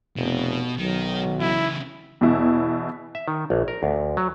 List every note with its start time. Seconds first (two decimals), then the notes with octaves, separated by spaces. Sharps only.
0.16 F1 B2
0.79 B1 D#3 F#3
1.40 C#3 E3 E4
2.21 E2 B2 E4
3.15 E5
3.28 D#3
3.50 A#1
3.68 A#4
3.83 D2
4.17 F#3